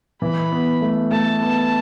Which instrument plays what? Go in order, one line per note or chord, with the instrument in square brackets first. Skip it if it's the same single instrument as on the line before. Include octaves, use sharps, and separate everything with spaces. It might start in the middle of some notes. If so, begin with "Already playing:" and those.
[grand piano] E3 [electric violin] B5
[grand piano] B3
A3
[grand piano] A3 [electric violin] A5
[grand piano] B3